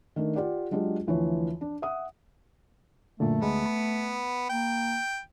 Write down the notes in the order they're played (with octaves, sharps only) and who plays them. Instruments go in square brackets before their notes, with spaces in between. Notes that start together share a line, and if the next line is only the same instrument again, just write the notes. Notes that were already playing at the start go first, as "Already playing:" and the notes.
[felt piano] D#3 A3 D4
F4 G4 D5 F#5
F#3 G#3 D4 F4 G4
D2 E3 F3 C#5
D4
E5 F#5 D#6
[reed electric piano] F#2 A#2 D3 [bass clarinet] A3
[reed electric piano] D2 G#3 [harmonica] B3
[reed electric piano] B5
[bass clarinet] A#3 [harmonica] G5